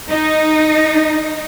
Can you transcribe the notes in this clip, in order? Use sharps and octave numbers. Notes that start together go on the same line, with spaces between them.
D#4